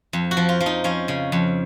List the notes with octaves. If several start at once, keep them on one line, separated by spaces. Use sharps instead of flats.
F2
F#4
F3
F4
F3
D#4
F3 C#4
C#3
F2